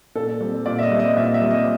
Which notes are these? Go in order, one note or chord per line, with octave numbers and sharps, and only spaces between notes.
A#2 A4
G3 C4
A#2 D5
E5
D#5
G3 C4
D#5
A#2 E5
E5
G3 C4
D#5